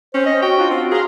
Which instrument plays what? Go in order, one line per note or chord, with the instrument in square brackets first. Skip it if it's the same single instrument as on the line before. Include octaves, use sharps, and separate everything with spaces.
[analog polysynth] C4 [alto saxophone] C#4 [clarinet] C5
[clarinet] D#5
[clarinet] F#4 [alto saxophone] G5
[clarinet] D4 [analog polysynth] F4 F#4
[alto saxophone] C4
[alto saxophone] G#4 [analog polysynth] F5 A#5 C6